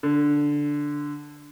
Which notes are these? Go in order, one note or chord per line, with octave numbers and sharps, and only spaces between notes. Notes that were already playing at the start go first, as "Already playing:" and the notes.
D3